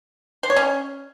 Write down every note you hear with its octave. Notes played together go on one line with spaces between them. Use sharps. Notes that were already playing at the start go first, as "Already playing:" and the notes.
C5
C#5
C#4